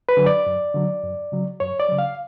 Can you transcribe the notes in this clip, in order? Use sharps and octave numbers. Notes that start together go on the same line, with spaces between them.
B4
D3 F#3
D5
F#2
D3 F#3
F#2
C#3 F#3
F#2 C#5
D5
C#3 F#3
F5